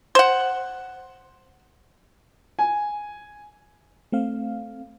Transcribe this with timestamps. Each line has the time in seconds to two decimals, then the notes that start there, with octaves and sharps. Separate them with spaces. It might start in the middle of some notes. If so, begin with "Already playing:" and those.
0.15 C5 F#5
2.59 G#5
4.12 A3 C4 F5